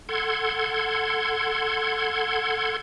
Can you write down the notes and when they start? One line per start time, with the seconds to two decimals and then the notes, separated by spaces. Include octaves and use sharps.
0.09 A4 F#5 C6 G#6